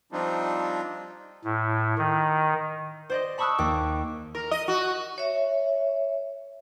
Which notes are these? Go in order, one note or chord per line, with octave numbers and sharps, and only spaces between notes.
F3 G3 C4 D4 D#4 F4
A2
D#3
C5 D5 D#5
A5 B5 C#6 D#6 E6 F#6
D#2 D6
A#4
D#5
F#4
C#5 E5